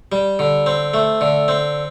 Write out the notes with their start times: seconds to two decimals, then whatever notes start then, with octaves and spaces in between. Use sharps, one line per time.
0.12 G3
0.39 D3
0.66 C4
0.94 A3
1.21 D3
1.48 C4